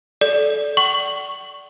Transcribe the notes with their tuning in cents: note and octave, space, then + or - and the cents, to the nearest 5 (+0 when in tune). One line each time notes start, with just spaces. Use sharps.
A4 -15 D5 -5
F#5 +40 C#6 +0